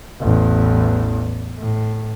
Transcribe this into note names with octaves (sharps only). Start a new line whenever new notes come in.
A1 E2
A2